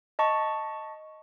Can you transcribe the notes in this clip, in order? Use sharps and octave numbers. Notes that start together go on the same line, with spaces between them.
D#5 A5 C#6